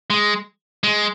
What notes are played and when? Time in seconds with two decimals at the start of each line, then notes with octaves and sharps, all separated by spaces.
0.10 G#3
0.83 G#3